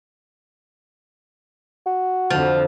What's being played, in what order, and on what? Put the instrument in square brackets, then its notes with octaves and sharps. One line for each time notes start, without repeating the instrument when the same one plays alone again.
[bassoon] F#4
[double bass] F2 D3 [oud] F3